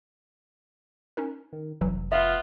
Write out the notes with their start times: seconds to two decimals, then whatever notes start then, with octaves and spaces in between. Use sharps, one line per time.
1.17 C#4 D#4 A#4
1.53 D#3
1.81 F1 C2 E3 F#3
2.12 B3 F4 E5